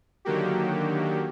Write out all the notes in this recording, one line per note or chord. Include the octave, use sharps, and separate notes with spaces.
D3 D#3 F#3 A#3 F#4 G4